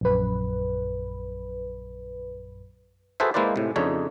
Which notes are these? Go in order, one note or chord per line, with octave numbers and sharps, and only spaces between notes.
A#1 F#2 B4
F#4 G#4 A4 B4 C5 E5
G#3 A#3 E4 B4 C5 D5
A2 C3
F2 C#3 D4 D#4 C#5